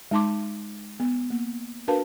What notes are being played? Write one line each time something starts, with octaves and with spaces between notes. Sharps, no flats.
G#3 D#4 A5 C6 D6
B3
A#3
D4 F#4 A#4 B4 F5 A5